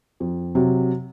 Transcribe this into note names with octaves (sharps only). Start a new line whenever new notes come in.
F2
C3 F#3